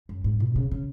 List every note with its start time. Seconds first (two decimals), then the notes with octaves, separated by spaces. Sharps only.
0.09 F#2
0.24 G#2
0.40 B2
0.55 C#3
0.71 C#3